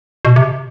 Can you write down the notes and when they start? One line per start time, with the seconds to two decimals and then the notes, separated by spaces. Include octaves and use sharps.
0.25 B2
0.36 C3